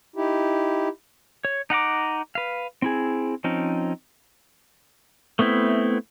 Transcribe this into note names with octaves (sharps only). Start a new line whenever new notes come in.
D#4 E4 G4
C#5
D#4 F#5 A#5 D6
B4 F5
C4 E4 G#4
F3 C4 C#4 D#4
A3 B3 C4 E4